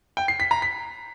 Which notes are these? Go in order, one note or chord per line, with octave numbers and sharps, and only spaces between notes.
G5
C7
B6
A#5
B6